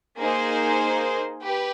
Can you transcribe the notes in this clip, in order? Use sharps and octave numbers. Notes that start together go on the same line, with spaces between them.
A#3 D#4 G#4 C5
G4 B4